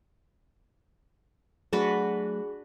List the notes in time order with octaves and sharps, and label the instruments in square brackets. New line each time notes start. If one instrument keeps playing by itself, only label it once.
[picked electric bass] F#3 A3 [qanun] D4 F#4 B4 [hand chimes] G#4